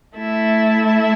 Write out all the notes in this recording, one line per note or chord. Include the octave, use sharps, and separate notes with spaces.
A3 E4 A4 E5